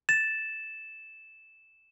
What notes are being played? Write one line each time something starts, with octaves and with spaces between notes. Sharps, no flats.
A6 E7